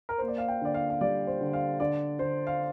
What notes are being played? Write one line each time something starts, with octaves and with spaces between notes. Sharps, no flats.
A#4
A#3 C5
D5
F5
G5
D3 D5
F5
F5
G3 D5
C5
D3
F5
D3 D5
D3 C5
F5